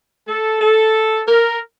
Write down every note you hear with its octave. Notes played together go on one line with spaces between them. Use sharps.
A4
A4
A#4